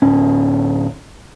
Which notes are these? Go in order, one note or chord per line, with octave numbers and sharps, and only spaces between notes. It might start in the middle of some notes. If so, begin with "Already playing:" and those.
D1 C#4